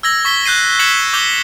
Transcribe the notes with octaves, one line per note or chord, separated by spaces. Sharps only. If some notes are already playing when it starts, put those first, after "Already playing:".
E6 G#6 A#6 F#7
C#6 B6 G7
F#6 G6 C7 D#7
G6 G#6 B6 C#7 E7 F#7
D6 G6 G7